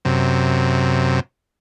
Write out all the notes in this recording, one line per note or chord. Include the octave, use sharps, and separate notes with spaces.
F#2 C3